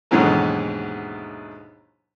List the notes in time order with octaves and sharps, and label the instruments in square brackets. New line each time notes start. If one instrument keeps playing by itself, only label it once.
[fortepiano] D#2 G#2 B2 D3 E3 F#3